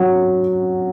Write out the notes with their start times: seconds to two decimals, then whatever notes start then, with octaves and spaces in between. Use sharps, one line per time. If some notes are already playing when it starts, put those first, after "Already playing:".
Already playing: F#3